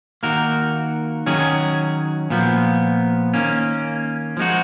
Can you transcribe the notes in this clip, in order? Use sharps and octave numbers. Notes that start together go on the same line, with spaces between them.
D#3 A#3 D#4 F#4 A#4
D#3 F#3 C#4 G#4
A#2 F3 B3
D#3 A#3 C#4
F3 G#3 D#4 F#4